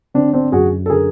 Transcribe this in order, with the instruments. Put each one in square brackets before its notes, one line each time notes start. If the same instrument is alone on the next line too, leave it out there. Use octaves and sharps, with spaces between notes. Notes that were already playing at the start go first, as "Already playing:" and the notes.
[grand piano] D3 C4 D4
C4 D4
F#2 F#4 G#4
A4
D3 G#4 A#4